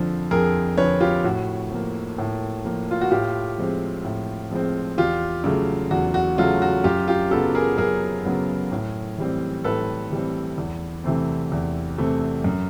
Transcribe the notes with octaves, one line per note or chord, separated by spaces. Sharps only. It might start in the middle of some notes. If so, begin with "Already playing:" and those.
Already playing: F2 D3 F3
F2 G#4 A#4
D3 F3 B4 C#5
F4 G4
A2 F#4
F3 A#3
A2
F3 A#3
F4
F#4
A2 F4 G4
F3 G#3 C4
A2
F3 G#3 C4
E2 F4 G4
C#3 F#3 A3
E2 F#4
F#4
C#3 F#3 A3 F4
F#4
F#2 F4 G4
F4 G4
C#3 F#3 B3 G4 A4
G#4 A#4
F#2 G#4 A#4
C#3 F#3 B3
A2
E3 G3 C4
A2 A4 B4
E3 G3 C4
E2
C3 E3 A3 C4
E2
C3 E3 A3 C4
F#2